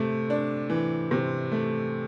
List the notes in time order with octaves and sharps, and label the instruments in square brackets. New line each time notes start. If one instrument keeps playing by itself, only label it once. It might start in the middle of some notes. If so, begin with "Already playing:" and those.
Already playing: [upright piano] C3 A3
D4
E3
C3
A3